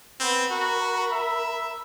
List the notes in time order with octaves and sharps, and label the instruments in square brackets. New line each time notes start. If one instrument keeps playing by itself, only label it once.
[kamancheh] B3 B5 [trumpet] C4
[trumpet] F#4 [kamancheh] A#4 B5
[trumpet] E5